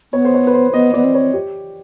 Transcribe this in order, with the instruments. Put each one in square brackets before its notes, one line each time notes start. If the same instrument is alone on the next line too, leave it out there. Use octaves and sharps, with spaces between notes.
[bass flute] B3 [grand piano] C#5
[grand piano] C5
C#5
B4
C5
[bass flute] B3 [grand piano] D#5
[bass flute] B3 [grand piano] D5
[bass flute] C4
[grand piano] C#5
G4